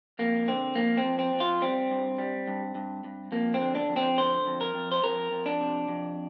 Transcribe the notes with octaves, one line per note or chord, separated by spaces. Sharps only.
F2 A#3
D3 C4
F2 A#3
C4
F2
C4
F2
F4
G3 C4
G2
G3
G2
G2
G2
F2 A#3
C4
D3
D4
F2
C4
D3 C5
F2
A#4
F2
C5
F2 A#4
F2
D4
C3
F2